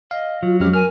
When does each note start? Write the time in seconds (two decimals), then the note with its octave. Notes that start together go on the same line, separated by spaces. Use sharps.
0.11 D#5 F5
0.43 F#3 F4
0.60 F2 G#3 C#4 G4 F6
0.74 A#4 G#5 F6